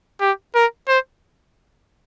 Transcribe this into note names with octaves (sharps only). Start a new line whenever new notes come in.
G4
A#4
C5